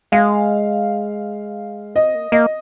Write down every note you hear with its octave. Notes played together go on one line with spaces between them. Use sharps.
G#3 F5
C4 D#5
A#3
A#3 D#5